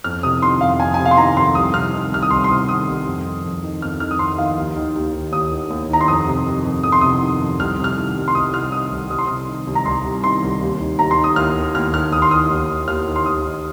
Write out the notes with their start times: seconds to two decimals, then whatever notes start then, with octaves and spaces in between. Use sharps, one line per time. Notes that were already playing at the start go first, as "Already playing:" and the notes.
0.04 F2 F6
0.23 C3 D#6
0.42 D#3 C6
0.61 F2 F5
0.80 F2 G#5
0.94 C3 G#5
1.06 F5
1.11 C6
1.17 D#3 A#5
1.36 F2 C6
1.55 C2 D#6
1.74 C3 F6
1.93 D#3
2.12 C2 F6
2.23 D#6
2.31 C2 C6
2.44 C6
2.50 C3 D#6
2.68 D#3 D#6
2.88 C2
3.06 F2
3.25 D#3
3.44 F2
3.63 D#3
3.82 F2 F6
4.00 D#3 F6
4.11 D#6
4.19 F2 C6
4.38 D#3 F5
4.57 D#2
4.76 D#3
4.96 D#2
5.14 D#3
5.32 D#2 D#6
5.52 D#3
5.70 D#2
5.89 D#3 A#5
6.01 C6
6.08 F2 D#6
6.27 C3
6.46 D#3
6.65 F2
6.83 F2 D#6
6.92 C6
7.01 C3 D#6
7.22 D#3
7.40 F2
7.59 C2 F6
7.78 C3
7.84 F6
7.97 D#3
8.16 C2
8.28 C6
8.35 C2 D#6
8.54 C3 F6
8.72 D#3 D#6
8.92 C2
9.10 C2 D#6
9.19 C6
9.27 C3 D#6
9.48 D#3
9.67 C2
9.75 A#5
9.86 C2 C6
10.05 C3
10.24 D#3 C6
10.42 C2
10.61 D#2
10.80 D#3
10.99 D#2 A#5
11.11 C6
11.18 D#3
11.24 D#6
11.36 D#2 F6
11.56 D#3
11.75 D#2 F6
11.93 D#3 F6
12.12 D#2 D#6
12.22 C6
12.31 D#3 D#6
12.50 D#2
12.69 D#3
12.87 D#2 F6
13.07 D#3
13.16 C6
13.25 D#2 D#6
13.45 D#3